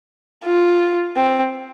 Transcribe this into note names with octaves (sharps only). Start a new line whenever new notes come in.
F4
C4